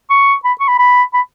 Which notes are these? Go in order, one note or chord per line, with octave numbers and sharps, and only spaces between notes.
C#6
B5
C#6
B5
B5
B5